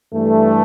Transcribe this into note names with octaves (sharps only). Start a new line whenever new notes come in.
G2 E3 G3 A3